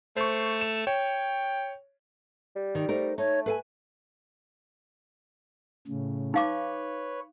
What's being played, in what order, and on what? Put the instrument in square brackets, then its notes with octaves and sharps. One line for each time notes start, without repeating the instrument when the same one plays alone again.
[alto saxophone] A3 [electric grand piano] C5 C#6
[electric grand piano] E7
[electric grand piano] C#5 [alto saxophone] G5
[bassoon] G3
[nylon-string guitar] D#3
[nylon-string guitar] A3 D#4 A#4 [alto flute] C5
[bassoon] A3 [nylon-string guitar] D#4 [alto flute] C#5
[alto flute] A4 [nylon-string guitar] B4 F5 G#5
[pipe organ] A2 C#3
[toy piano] D#4 F5 D6 [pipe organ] B4 C#5